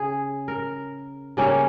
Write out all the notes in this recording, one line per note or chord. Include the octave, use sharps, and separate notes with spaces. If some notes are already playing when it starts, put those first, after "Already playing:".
Already playing: C#3 G#4
A#4
C#3 G3 A#3 C#4